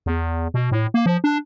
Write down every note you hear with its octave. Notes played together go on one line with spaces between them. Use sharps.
E2
B2
A2
A#3
F3
D4